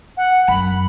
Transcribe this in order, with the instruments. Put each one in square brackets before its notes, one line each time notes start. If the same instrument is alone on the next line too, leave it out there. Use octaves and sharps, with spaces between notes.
[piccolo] F#5
[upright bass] F#2 [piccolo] B5